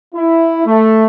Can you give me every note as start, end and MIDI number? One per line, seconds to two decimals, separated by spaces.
0.15 0.66 64
0.66 1.07 57